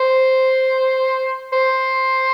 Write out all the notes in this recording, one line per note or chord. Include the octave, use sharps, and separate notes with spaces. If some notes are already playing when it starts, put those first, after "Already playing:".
Already playing: C5
C5